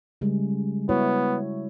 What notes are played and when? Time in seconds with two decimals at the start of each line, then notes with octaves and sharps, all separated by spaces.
0.21 C#3 G3 G#3
0.89 B3 E4 F#4 C#5